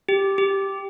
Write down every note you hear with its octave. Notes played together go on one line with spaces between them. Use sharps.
G4
G4